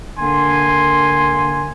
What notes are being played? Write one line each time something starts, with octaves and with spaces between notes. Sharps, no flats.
D3 A#3 G#5 C6